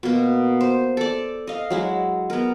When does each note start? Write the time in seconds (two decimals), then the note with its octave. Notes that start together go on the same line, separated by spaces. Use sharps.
0.03 B2 A#3
0.61 C5
0.97 A4 D5
1.47 D#5 F5
1.70 F#3 G#3 E4
2.30 B3 A#4